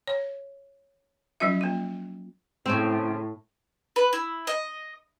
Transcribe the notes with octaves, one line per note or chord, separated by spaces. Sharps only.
C#5
F3 F#3 C#4 F4 E5
A#3 F4
A2 C#3 C4
B4
E4
D#5